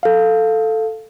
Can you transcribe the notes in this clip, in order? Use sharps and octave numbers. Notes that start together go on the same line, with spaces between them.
A4 F5